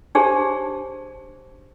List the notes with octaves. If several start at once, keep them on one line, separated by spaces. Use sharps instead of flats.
D4 G4 G#4 C5 C#5 A5